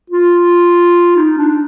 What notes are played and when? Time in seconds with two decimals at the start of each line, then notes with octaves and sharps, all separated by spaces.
0.10 F4
1.16 D#4
1.37 D4